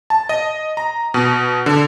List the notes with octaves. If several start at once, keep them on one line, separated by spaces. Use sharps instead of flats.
A5
D#5
A#5
B2
D3